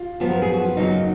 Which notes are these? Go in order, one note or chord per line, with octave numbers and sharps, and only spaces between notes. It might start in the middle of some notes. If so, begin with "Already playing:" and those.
Already playing: F4
F#2 F3 B3
A#4
G#4
F#4
F4
F#2 C#3 F#3 A#3 D#4